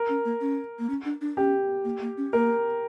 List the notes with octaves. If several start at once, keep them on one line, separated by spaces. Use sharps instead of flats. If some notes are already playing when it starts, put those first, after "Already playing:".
Already playing: A#4
C#4
A#3
C#4
A#3
C#4
D4
D4
C#4 G4
A#3
A#3
C#4
A#3 A#4